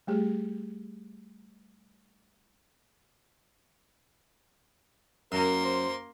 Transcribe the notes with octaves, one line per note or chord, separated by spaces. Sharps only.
G3 A3 G4 G#4
F#2 A#3 A#4 C6
C5